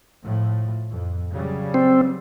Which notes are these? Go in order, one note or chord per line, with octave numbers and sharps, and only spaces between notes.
A2 F3
F2
C#3 F#3 G3
C4